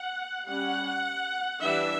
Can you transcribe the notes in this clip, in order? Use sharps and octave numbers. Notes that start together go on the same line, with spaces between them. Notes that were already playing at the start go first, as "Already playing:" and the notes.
Already playing: F#5
G3 C#4 F#5
E3 G3 D4 E5